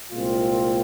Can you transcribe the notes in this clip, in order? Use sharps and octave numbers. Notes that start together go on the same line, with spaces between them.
C2 A#2 G#3 C4 F4